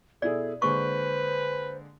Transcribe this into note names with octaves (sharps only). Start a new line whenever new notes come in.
B2 E4 G#4 A4 D5
D3 G#3 A#3 B4 C5 C#6